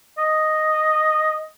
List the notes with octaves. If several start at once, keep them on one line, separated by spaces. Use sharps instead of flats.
D#5